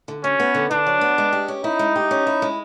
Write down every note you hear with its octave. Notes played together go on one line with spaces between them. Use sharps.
D3
F#3 C#4
B3
D3
D3 D4
F#3
B3
G#3
G4
C#4
D#4 E4
G#3
G4
C#4
E4
G#3